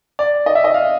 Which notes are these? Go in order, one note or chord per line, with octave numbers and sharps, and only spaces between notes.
D5
D#5
E5
D#5
F5